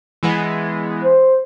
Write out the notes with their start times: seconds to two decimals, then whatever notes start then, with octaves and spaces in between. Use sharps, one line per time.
0.23 E3 G#3 B3
1.04 C5